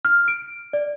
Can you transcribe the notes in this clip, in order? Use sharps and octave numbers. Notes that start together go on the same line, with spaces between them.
F6
D7
D5